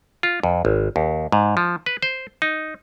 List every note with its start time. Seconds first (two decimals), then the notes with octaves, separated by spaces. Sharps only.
0.23 F4
0.43 F2
0.65 G#1
0.96 D#2
1.32 G#2
1.57 F3
1.86 B4
2.02 C5
2.42 D#4